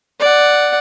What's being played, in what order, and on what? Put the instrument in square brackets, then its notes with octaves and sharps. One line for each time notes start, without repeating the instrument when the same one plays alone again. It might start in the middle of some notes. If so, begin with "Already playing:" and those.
[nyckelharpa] D5 F#5